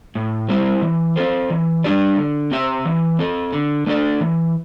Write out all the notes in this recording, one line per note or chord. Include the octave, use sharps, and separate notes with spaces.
A2
G3 C4 E4
E3
C4 A4 C5
E3
G3 D4 G4 D5
D3
C4 G4 E5
E3
C4 A4
D3
A3 D4 A4 D5
E3